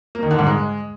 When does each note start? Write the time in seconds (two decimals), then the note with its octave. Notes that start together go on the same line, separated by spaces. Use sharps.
0.15 A#3
0.23 D#3
0.31 D3
0.39 G#2
0.46 G#3